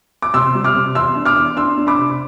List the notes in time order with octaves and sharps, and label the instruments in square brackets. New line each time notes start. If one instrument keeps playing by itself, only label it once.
[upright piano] D6
C3 C6 E6
G3
D6 F6
C3
E2 C6 E6
D4
D6 F6
E2
D4 C6 E6
D4
B5 D6
C3